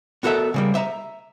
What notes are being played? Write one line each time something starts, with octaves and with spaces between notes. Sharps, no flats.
B3 F#4 A4 A#4 E5
C#3 G3 A#3
E5 A#5